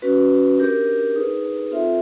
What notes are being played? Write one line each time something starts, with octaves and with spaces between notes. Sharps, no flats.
C#4 F#4 B4
D4 G4 A#4
D#4 G#4 B4
C4 F4 A4 C5 E5